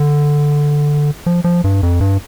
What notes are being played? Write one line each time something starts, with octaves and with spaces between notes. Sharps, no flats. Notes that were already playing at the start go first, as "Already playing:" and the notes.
Already playing: D3
F3
F3
G2
F2
G2